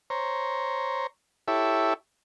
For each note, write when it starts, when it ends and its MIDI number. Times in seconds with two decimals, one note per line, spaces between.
0.10 1.07 72
0.10 1.07 73
0.10 1.07 82
1.48 1.94 64
1.48 1.94 67
1.48 1.94 69
1.48 1.94 73
1.48 1.94 76